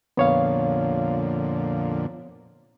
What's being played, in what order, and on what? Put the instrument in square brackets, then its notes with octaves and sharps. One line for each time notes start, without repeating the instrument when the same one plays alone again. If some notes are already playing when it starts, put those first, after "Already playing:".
[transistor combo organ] F2 A#2 D3 [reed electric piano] B3 C#5 F5